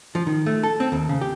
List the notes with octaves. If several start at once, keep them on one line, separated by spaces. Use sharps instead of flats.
F3
D#3
A3
A4
C4
D#2
C#3
G4